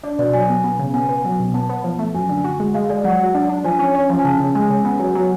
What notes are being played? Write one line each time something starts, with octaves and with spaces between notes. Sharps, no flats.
D4 D5
B2 D5
F#3 G#5
B2
B3
C#3
B3 G#5
B3
F#3
B2
B3 A5
B3
F3
A3
F#2 G#5
D3
F#4
G#3
G#3 F5
G#3 D5
F#3 F#5
F#3
D4
D4
F3 G#5
C#4
C#4
F3
G#5
C#3 A5
C#3
G#3 G#5
C#3
B3
F#3
F#3